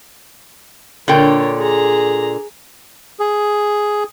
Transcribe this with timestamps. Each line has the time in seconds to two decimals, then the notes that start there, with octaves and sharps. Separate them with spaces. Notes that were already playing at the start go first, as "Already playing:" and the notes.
1.08 A#2 D3 A#4 C#5 G5
1.59 G#4 A#5
3.19 G#4